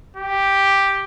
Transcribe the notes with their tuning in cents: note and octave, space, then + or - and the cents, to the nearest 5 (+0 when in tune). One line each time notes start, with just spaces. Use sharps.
G4 +0